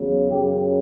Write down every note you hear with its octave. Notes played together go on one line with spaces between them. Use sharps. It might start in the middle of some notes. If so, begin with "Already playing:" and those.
Already playing: E2 C#3 F#3
F#2 C#3 F#3 G4